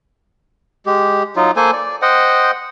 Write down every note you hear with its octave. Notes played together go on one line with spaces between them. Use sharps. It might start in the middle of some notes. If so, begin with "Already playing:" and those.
G#3 G4
F#3 D#4 F4
A#3 A4 C5 G#5
D5
C5 D#5 F#5 G5